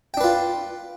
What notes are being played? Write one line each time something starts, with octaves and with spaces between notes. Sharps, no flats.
D4 F4 B4 G5